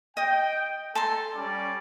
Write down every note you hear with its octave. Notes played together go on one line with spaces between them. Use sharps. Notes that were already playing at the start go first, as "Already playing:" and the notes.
D#5 G5 D#6
A4 A5 A#5 C6
G3 C#4 D5